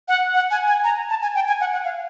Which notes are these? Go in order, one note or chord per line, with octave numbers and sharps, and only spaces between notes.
F#5
F#5
G#5
G#5
A#5
A5
G#5
G5
G#5
F#5
F#5
F5